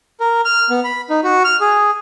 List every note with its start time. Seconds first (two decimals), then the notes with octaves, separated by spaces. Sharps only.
0.20 A#4
0.45 F6
0.70 B3
0.84 B5
1.10 D#4
1.24 F#4
1.44 F6
1.61 G#4